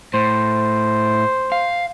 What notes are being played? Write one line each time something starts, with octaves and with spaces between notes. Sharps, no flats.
A2 C5
F5